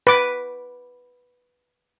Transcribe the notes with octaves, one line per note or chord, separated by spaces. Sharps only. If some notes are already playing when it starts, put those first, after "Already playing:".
B4 D6